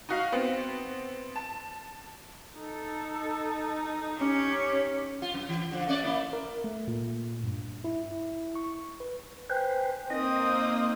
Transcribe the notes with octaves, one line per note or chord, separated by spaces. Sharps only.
D#4 F#4 F5
B3 C4
A5
D#4 A4
C#4 G4 C#5
F4
F#2
E3
D3 F3
A3 C#4 D5
A3 A#3 E4
A#4
A3
A#2
G2
E4
C#6
B4
B4 C5 G5 G#5
A#3 C4 D#4 A#4 D#5 D#6